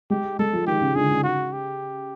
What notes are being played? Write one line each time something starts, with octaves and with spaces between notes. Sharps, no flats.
G#3 G4
G#3 A4
F3
D#3 G4
C#3
D3 G#4
C#3
F#4
G4